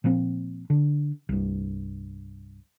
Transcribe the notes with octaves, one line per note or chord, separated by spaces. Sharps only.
A#2 F3 A#3 C4
D3
C2 G2